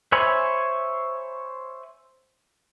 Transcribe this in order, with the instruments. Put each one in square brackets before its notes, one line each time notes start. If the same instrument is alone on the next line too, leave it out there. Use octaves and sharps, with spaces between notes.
[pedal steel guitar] C5 C#5 E5 G#5 B5